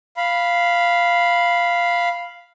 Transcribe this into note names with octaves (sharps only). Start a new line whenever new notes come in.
F5 B5